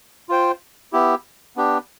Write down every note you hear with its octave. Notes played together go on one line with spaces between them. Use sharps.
F4 C5 G5
B3 E4 G4
B3 D4 G4